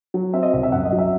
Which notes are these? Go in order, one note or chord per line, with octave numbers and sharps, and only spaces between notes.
F#3
C4 E5
D#5
C2 E5
E5
F#2 F#5
D#5
F#3
E5